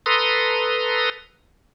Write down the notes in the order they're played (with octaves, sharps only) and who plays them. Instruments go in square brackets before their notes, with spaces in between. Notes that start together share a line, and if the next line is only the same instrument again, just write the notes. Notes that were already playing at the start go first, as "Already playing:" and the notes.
[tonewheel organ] A4 B4 A#5 C6 D#6